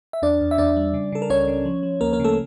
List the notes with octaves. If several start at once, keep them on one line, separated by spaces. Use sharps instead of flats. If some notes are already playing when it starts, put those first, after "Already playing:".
E5
E2 D4 D5
E2
E5
E2 D4 D5
G3
C#3
C#3 A4
A#4
C#2 C#4 C#5
C#3
F3
F3
D2 A#3 A#4
A#3 A#4
C#3 A3 A4